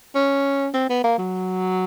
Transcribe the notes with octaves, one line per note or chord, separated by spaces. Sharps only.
C#4
C4
B3
A#3
F#3